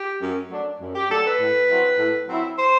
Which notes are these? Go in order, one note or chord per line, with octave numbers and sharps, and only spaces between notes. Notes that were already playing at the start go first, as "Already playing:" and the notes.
Already playing: G4
F#2
F#3 A3 D4
F#2
G4
F#3 A3 D4 A4
B4
A2
F#3 C4 E4
A2
F#3 C4 E4
C5